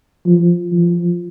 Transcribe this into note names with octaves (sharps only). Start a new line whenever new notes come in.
F3
F3